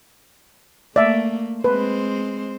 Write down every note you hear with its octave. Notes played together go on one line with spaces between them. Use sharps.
A3 A#3 D5 E5
G#3 C4 B4 C5